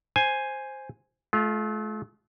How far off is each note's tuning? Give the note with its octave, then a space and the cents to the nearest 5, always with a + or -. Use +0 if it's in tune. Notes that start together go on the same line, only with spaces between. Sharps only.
C5 +5 G#5 +0
A3 -40 F4 +0